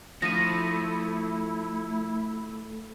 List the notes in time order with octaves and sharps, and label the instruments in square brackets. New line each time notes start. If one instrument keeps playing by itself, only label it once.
[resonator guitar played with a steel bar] F3 [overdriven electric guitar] A3 [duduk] E4 [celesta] A#6 D#7